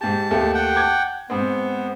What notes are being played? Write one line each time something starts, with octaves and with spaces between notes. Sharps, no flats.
G#2 G4 A5
D#2 A3 G4
F#5 G5
A5 D6 G#6
G#2 B3 C4